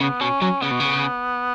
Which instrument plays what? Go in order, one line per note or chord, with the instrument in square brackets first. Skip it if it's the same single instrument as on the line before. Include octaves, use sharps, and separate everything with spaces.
[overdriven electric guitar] C#3 [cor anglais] B3
[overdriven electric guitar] B2 [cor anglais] C#4
[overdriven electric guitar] F#3 [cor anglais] C#4
[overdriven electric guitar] C#3 [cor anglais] B3
[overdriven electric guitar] B2
C#3